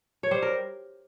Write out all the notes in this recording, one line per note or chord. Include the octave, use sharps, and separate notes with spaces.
C#5
G3 C5
A#4